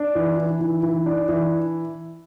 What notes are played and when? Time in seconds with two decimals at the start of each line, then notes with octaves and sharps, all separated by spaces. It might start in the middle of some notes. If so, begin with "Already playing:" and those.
Already playing: D4
0.15 E3
0.38 E3
0.61 E3
0.83 E3
1.06 D4
1.29 E3